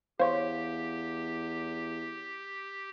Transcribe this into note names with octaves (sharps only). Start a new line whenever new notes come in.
E2 G4 C5 C#5 F5